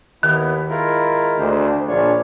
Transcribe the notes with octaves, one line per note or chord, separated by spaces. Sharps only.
D#2 D#3 B3 E4
G#3 E4 F4 A#4
D2 C5
A#1 D4 F4 C#5